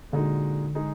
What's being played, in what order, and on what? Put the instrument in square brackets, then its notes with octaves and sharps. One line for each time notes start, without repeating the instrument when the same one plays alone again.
[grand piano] A#2 G#3 D#4 F#4 [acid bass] D3
[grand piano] G#3 D#4 G#4